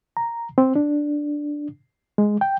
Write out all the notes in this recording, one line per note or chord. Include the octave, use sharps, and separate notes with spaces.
A#5
C4
D4
G#3
G5